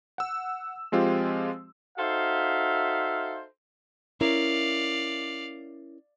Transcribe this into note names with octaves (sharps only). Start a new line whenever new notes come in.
F#5 E6
F3 G#3 C4 F4 G4
D#4 F#4 A4 C5 E5 F5
C#4 E4 A#4 D5 F5